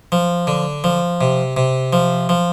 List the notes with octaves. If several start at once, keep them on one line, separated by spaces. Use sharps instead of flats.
F3
D3
F3
C3
C3
F3
F3